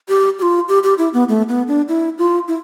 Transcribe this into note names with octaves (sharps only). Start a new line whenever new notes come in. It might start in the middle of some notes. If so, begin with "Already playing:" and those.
G4
G4
F4
G4
G4
E4
B3
A3
B3
D4
E4
F4
E4